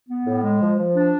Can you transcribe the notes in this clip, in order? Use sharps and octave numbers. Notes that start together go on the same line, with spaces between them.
B3
A2
G#3
F3
F3
D4